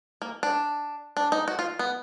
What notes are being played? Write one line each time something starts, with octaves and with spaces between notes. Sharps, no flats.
A#3
D4
D4
D#4
F#4
F4
B3